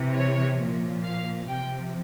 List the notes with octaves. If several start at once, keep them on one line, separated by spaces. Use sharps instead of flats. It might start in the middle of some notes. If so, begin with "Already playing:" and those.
Already playing: C3 E3
C#5
A#2 F3
F5
C3 F3 G5